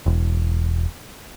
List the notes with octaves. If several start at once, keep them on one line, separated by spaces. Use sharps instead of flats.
E1